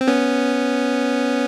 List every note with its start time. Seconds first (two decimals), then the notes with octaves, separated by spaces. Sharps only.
0.01 C4
0.07 B3 C#4